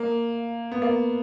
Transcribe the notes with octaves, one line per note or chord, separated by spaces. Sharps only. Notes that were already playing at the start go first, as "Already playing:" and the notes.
Already playing: A#3
B3
A#3